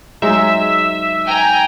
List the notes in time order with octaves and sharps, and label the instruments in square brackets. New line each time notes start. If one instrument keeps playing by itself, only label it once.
[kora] F#3 G#3 D#4 [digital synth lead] E5
[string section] G5 G#5 A#5